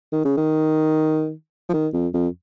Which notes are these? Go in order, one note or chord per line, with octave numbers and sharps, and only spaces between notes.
D#3
C#3
D#3
F3
D#3
F2
F2